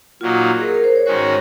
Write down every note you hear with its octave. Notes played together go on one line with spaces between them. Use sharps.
A#2 F#3 A#3 D#4 F4
G#4
A#4
A#4
C5
C#5
G#2 D#3 G#3 C#4 F#4 C5
C#5